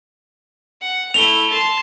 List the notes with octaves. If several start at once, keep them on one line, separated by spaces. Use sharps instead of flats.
F#5
A3 E4 F7 G7
A5 C6